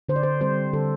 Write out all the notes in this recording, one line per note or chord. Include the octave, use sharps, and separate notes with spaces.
D3 C5
D5
C5
G3 C4 C5
D3 A4